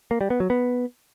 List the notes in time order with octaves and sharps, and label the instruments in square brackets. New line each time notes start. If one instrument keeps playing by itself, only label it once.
[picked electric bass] A#3
G3
B3
F#3
B3